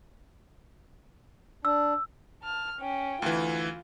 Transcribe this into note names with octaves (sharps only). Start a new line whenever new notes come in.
D4 E6
A5 F6
C#4 G5
D2 E3 F4